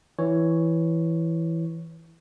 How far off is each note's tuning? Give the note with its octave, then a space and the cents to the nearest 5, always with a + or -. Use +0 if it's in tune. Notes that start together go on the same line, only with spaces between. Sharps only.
E3 +0 C#5 +0